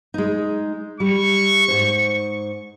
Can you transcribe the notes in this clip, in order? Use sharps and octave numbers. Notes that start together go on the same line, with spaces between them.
G#3 D#4
G3 C#6
G#2 C5